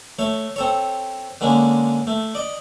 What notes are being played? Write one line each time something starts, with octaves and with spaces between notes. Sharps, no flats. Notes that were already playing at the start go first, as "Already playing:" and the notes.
A3 C#5
C4 A4 C#5
D3 G#3 A#3 C#4
A3
D5 D#5